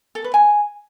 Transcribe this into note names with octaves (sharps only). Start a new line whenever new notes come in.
A4
B4
G#5